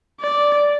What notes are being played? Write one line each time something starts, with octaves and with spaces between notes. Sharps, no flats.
D5